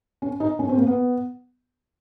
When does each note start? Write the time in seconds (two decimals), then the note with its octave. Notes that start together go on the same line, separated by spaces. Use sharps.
0.22 C#4
0.40 D#4
0.59 C#4
0.69 C4
0.78 A#3
0.87 B3